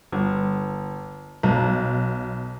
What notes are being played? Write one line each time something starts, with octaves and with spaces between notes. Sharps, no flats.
G1
B1